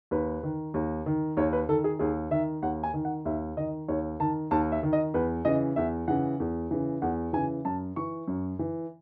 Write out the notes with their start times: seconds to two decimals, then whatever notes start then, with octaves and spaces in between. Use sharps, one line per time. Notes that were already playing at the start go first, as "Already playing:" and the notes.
0.11 D#2 B4
0.43 D#3
0.74 D#2
1.06 D#3
1.37 D#2 C#5
1.53 B4
1.69 D#3 A4
1.84 G#4
1.99 D#2 G#4
2.31 D#3 E5
2.62 D#2 F#5
2.83 G#5
2.94 D#3
3.05 F#5
3.25 D#2 E5
3.57 D#3 D#5
3.88 D#2 C#5
4.20 D#3 A5
4.51 D#2 A5
4.72 E5
4.83 D#3
4.93 D#5
5.14 E2 B4
5.45 C#3 E3 D#5
5.76 E2 E5
6.08 C#3 E3 F#5
6.40 E2
6.71 C#3 E3
7.02 E2 F#5
7.33 C#3 E3 G#5
7.65 F#2 A5
7.96 E3 C#6
8.28 F#2
8.59 E3